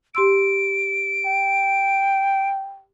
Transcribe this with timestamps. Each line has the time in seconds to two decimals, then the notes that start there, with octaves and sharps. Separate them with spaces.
0.15 G4 C6 E6 D7
1.26 G5